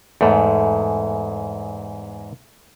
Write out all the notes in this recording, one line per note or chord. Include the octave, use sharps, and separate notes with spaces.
E2 G#2 A3